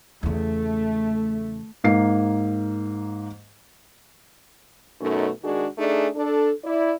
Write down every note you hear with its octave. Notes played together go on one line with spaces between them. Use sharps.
E2 C#3 A3
G#2 A#3 C7
F#2 B2 A3 C#4 D#4
D#3 G#3 D4 F#4 G#4
A3 D4 D#4 G#4
D4 A4
E4 D5